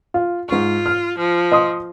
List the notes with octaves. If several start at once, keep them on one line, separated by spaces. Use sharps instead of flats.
F4
G#2 F4 C#6
F6
F3
D#5 C6 D#6